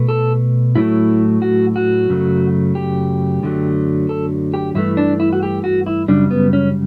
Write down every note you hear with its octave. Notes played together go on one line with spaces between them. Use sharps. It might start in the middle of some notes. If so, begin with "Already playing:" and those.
Already playing: B2 A3
A4
A2 F#3 A3 E4
F#4
F#4
F#2 C#3 F#3 A3
G4
F#2 D3 F#3 A3
A4
G4
G2 E3 A3 E4
D4
E4
F#4
G4
F#4
E4
F#2 C#3 G3 D4
B3
C#4